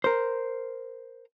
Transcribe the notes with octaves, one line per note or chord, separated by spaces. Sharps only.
A#4 C5